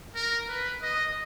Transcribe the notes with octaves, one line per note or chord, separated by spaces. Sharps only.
A#4
B4
D#5